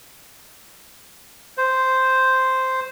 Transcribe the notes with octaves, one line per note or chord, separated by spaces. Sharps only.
C5